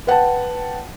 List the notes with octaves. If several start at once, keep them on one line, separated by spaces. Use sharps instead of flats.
B4 F#5 G5 A5